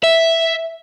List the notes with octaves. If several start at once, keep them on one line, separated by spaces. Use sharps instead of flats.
E5